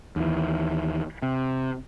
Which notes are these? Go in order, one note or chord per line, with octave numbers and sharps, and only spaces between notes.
D#2 E3
C3